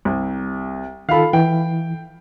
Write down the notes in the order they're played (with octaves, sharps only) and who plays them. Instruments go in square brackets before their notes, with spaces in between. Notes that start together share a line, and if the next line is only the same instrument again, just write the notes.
[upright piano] C2
[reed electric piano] D#3 F4 A4 [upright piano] F5 B5
[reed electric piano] E3 [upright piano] G5